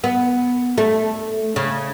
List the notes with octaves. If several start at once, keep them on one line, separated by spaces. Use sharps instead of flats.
B3
A3
C#3